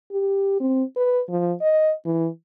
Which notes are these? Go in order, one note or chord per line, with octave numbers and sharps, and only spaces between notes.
G4
C4
B4
F3
D#5
E3